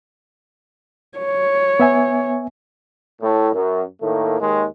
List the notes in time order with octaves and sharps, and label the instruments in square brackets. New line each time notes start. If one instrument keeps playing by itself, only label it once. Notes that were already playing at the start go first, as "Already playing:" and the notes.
[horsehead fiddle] C#5
[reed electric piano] B3 E5 G#5
[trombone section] A2
F#2
A2 D#3 A3 A#3
D#2 D#3 G#3